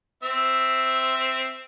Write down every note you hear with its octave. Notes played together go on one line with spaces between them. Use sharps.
C4 E5